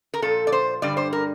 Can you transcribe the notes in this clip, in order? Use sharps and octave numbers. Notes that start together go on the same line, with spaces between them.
A#4
A#2 F3 A4
D5
C5
G2 D3 G3 D5
C5
A#4